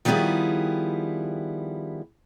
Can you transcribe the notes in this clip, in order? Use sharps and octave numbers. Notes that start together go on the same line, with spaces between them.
D#3 F3 G3 B3 E4 G#4